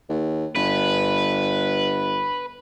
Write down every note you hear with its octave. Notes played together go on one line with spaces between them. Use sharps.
D#2
G1 B4